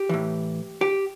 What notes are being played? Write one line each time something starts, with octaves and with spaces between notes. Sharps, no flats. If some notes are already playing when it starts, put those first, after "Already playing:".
Already playing: G4
A2 E3
G4